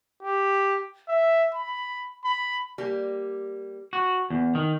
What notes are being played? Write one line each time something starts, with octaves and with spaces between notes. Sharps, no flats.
G4
E5
B5
B5
G3 A#3 G4
F#4
E2
D#3